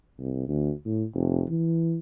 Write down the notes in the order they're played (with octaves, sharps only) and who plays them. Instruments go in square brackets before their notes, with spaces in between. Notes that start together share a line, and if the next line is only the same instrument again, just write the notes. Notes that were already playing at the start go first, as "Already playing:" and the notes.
[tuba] C2
D2
A2
F1
E3